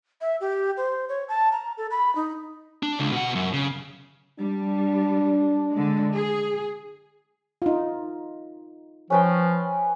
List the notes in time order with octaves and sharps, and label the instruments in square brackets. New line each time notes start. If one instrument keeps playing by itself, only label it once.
[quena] E5
G4
C5
C#5
A5
A#5
A4
B5
D#4
[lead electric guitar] D4
C#2
B2 F#5
F#2
C#3
[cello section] G3 [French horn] D4
[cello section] D3 G#3
G#4
[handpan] D#4 F4
[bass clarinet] F3 [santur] C#4 B4 G5